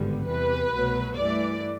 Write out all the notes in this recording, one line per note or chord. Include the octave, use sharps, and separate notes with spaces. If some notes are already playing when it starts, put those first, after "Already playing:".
Already playing: G#1 G2 D3 G3 B3
E2 C3 E3 G3 B4
C2 B2 F#3 A3
G2 E3 A3 D5